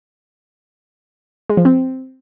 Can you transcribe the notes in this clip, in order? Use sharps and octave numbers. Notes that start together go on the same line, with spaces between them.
G#3
F3
C4